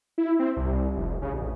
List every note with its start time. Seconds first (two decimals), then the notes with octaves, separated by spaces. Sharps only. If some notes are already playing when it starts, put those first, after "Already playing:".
0.18 E4
0.39 C4
0.56 C2
0.96 F1
1.22 C#3
1.33 A1